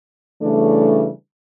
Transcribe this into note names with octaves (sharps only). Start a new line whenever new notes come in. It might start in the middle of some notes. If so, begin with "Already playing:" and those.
C#3 E3 G3 A3 D4 A4